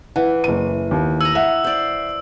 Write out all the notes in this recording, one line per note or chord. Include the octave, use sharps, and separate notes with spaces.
E3 F#5
F#1 D#7
D#2
G#5 A#5 E6
E5 F#5
C5 D5